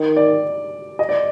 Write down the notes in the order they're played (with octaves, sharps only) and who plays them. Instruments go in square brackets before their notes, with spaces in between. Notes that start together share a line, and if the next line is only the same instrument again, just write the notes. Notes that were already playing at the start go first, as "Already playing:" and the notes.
Already playing: [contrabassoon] D#3
[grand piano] D5
D#5
D5